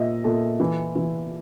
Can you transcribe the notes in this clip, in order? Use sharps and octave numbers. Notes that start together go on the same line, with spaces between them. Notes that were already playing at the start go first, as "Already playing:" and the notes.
Already playing: A#2 D#5 E5
A#2 A4
E3
E3